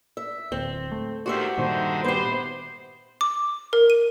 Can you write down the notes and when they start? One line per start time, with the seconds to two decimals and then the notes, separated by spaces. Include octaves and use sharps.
0.17 E5
0.52 D1 C4
0.92 A3
1.26 E2 D#3 F#4 G4 C5 E5
1.57 G2 A#2 D3 D#3 D#4 C5
2.04 B3 G4 C5
3.21 D6
3.73 A#4
3.90 D#7